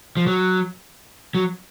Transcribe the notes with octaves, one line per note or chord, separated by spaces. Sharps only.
F3
F#3
F#3